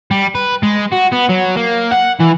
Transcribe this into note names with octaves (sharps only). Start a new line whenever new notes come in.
G3
B4
G#3
F#4
B3
F#3
A#3
F#5
E3